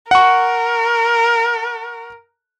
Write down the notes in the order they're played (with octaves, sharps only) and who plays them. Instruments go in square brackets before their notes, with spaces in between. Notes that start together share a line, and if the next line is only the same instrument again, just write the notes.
[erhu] A#4 [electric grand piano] F#5 C#6